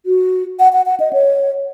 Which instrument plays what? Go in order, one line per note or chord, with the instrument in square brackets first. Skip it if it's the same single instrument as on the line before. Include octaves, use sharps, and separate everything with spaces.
[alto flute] F#4
F#5
F#5
F#5
D#5
C#5